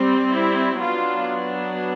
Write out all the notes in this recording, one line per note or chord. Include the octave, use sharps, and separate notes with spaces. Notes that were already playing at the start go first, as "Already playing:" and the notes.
Already playing: G3 C4
E4
F#3 B3 D4 F4